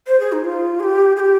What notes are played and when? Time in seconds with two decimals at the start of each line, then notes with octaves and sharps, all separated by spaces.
0.07 C5
0.20 G#4
0.32 D#4
0.44 F4
0.80 G#4
0.83 G4
1.16 G#4
1.20 G4